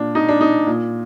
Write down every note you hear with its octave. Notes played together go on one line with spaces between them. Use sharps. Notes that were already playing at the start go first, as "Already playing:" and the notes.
Already playing: A#2 D4
D#4
D4
D#4
A#2